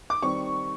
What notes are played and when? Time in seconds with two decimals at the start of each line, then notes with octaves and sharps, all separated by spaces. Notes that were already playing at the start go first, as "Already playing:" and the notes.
0.10 D6
0.22 D#3 G3 C4 C#6